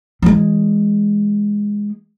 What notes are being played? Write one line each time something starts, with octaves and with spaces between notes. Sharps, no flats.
E3 G#3